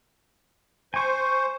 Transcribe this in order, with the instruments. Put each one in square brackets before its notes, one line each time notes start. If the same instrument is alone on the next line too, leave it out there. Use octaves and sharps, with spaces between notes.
[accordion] C5 [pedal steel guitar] G#5 C#6